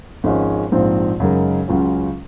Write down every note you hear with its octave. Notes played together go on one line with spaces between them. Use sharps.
G#1 G#2 F3 G#3 C#4
A#1 G#2 F3 C4 F4
F#2 C#3 G#3 D#4 A#4
C#2 C#3 F#3 C#4 F4